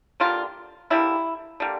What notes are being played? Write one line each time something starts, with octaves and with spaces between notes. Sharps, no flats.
D3 G3 A#3 F4
D3 G3 A#3 E4
D3 G3 A#3